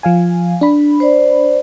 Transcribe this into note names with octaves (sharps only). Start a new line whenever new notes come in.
F3 F5 G#5
D4 B5
C5 D5